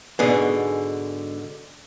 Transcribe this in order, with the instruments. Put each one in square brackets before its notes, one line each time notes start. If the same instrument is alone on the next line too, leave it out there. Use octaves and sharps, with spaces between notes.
[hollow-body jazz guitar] G#2 B2 D3 G#3